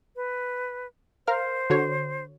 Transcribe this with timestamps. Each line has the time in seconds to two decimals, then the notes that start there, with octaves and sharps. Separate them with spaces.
0.16 B4
1.27 A#4 C5 F5 F6
1.70 D3 F#4 C#5